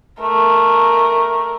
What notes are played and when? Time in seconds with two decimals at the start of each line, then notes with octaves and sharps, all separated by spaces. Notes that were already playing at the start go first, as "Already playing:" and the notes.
0.20 A3 A#4